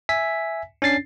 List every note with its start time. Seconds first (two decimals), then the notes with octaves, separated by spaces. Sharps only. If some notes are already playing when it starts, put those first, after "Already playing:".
0.09 E5 G#5 B6
0.82 C#4 D4 A6 C7